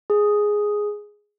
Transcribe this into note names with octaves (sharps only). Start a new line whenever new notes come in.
G#4